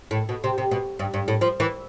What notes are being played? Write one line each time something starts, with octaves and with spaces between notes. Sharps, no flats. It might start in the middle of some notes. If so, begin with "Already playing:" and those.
A2
B2
C3
C3
B2
G2
G2
A2
F3
E3